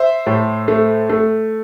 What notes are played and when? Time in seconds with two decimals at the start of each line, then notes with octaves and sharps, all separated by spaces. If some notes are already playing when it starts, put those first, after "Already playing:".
Already playing: C5 E5
0.27 A2
0.68 A3
1.10 A3